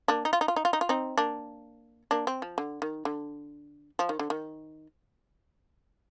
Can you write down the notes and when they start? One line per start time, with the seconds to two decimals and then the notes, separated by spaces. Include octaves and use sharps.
0.08 A#3 D4
0.25 D#4
0.33 F4
0.41 D#4
0.48 F4
0.56 D#4
0.65 F4
0.73 D#4
0.81 F4
0.89 C4 D#4
1.18 A#3 D4
2.11 A#3 D4
2.27 C4
2.42 F3
2.58 D3
2.82 D#3
3.05 D3
3.99 F3
4.09 D#3
4.19 D3
4.30 D#3